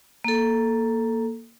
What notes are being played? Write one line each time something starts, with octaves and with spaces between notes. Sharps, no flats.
A#3 A4